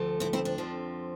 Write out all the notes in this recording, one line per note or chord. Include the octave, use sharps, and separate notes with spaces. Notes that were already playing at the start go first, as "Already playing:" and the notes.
Already playing: D2 C3 F3 A3
C4 E4
C4 E4
D4
F2 D3 F3 C4